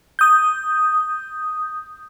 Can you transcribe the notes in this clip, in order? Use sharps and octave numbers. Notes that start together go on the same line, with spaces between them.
D#6 G6